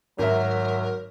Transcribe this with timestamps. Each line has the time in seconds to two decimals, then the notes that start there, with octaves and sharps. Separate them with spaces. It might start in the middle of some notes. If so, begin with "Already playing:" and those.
0.19 G#1 F#3 A#4 E5